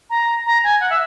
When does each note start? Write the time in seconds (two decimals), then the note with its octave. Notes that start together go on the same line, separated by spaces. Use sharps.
0.10 A#5
0.46 A#5
0.64 G#5
0.80 F#5
0.90 E5